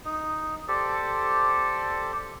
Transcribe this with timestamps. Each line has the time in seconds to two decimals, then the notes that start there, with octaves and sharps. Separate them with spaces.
0.05 D#4
0.68 G4 A4 C5 D5